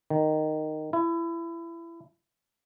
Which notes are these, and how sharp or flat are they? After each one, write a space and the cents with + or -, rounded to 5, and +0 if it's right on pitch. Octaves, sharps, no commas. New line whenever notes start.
D#3 -10
E4 +25